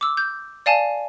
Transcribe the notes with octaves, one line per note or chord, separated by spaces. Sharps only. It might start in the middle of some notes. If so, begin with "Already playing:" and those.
D6 E6
G6
D5 F5 G#5 A5